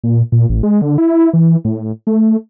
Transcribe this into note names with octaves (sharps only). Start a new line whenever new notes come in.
A#2
A#2
A1
G#3
D3
E4
E3
A2
A3